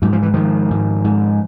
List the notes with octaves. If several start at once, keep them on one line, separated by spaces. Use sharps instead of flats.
G#2 F#3
F3
E3
G#2 D#3 F3
G#2
G#2